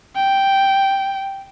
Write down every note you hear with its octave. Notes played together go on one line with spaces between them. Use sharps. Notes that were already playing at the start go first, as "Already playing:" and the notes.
G5